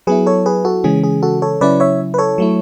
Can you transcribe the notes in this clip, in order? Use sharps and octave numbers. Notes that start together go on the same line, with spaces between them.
F#3 B3 E4 G#4 B4
A4 C#5
G#4 B4
F#4 A4
C#3 E3 G#3 C#4 G#4
G#4
F#4 A4
A4 C#5
C#3 F#3 C#4 E4 B4 D5
C#5 E5
B4
A4 C#5
F#3 A3 E4